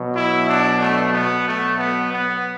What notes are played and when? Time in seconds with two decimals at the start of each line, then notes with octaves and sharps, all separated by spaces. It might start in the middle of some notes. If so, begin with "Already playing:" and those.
Already playing: B2 F#3
0.16 E4
0.48 D4
0.81 A3
1.13 B2 F#3 B3
1.46 A3
1.79 B3
2.12 B3